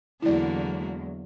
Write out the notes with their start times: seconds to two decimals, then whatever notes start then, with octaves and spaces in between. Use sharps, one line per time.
0.22 E2 D3 F#3 G#3 A#3 E4 F#4 D5